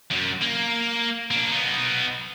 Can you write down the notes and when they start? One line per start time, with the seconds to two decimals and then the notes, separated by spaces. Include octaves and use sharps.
0.11 F#2 F#3
0.41 A#3
1.31 A#3 D4
1.51 B3 D#4